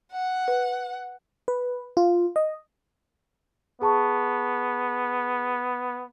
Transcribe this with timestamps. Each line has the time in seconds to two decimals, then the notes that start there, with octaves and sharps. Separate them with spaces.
0.11 F#5
0.48 B4
1.48 B4
1.97 F4
2.36 D#5
3.82 B3 G#4 A5 C#6